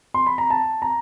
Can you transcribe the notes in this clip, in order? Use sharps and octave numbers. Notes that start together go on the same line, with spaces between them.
C6
B5
A#5
A5
A#5